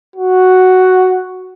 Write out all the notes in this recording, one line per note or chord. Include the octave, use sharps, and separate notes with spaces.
F#4